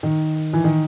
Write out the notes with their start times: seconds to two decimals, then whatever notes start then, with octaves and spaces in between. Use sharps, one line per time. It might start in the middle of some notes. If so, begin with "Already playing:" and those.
0.03 D#3
0.53 E3
0.64 D#3